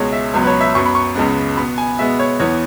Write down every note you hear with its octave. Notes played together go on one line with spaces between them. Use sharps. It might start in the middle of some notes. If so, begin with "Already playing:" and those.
Already playing: C#2 B2 G#3 C#5
E5
C#2 B2 F#3 B3
B4
C#5
E5
F#2 F#3 B3 C#6
B5
C#6
C#2 C#3 G#3 B3
B2 B3 B5
G#5
B2 G#3 B3 E5
C#5
E2 E3 B3 C#5